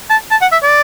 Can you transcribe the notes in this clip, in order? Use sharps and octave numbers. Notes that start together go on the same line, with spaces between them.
A5
A5
F#5
E5
D5